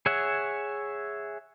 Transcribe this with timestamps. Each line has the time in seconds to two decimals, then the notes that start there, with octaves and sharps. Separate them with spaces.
0.06 G#4 C#5 E5 F#5